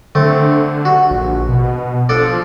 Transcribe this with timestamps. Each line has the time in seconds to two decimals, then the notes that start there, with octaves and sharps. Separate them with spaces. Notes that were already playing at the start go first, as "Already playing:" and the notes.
0.15 D3 A3 C4
0.85 F#4
1.11 A#1
1.48 B2
2.09 F3 D4 A4 D5